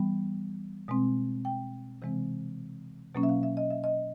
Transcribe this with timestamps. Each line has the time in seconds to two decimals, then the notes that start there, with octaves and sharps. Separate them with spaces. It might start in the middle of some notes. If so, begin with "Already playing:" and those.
Already playing: E3 G3 B3
0.88 B2 G#3 C4
1.45 G5
2.02 C3 E3 G#3 C4
3.15 B2 F#3 A#3 C#4
3.23 E5
3.29 F5
3.43 E5
3.57 D#5
3.70 E5
3.84 D#5